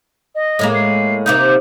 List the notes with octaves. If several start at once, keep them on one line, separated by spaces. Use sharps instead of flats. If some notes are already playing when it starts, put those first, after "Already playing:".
D#5
A2 G#3 A#3
C7
C3 A#3 D#4 G6